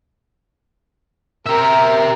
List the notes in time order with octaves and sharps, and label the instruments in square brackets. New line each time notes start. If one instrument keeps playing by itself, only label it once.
[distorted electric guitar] G4 E5 [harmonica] A#4